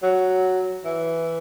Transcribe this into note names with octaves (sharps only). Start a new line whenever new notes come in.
F#3
E3